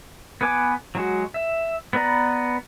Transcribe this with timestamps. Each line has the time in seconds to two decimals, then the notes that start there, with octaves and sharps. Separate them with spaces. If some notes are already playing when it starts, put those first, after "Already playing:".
0.41 B3 B4 G#5 D6
0.95 F#3 G#3 F#4
1.34 E5
1.93 B3 B4 D5 A#5